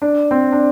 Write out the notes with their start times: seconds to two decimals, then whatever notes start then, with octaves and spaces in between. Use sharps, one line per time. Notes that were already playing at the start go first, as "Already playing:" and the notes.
0.02 D4
0.31 C4
0.52 D4